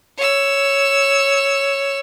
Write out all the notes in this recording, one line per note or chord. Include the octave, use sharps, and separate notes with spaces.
C#5 E6